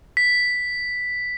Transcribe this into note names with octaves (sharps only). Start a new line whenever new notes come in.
B6